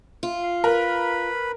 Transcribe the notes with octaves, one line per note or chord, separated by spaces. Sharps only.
F4
F5
A#4 B4 B5